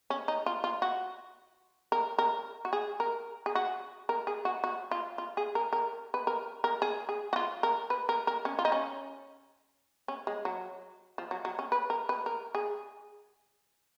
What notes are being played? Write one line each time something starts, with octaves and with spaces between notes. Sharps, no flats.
C#4
D#4
F4
F4
F#4
A#4
A#4
F#4
G#4
A#4
G#4
F#4
A#4
G#4
F#4
F#4
F4
F4
G#4
A#4
A#4
B4
A#4
A#4
G#4
G#4
F#4
F4
A#4
B4
A#4
A#4
C#4
F4
D#4
C#4
C#4
G#3
F#3
F3
F#3
F#3
C#4
B4
A#4
B4
A#4
G#4